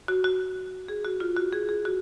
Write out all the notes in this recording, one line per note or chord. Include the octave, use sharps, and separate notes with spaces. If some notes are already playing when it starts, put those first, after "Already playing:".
F#4
F#4
G#4
F#4
F4
F#4
G#4
G#4
F#4